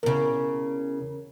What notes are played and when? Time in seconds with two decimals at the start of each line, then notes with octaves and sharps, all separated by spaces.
0.03 E2 C#3 A#4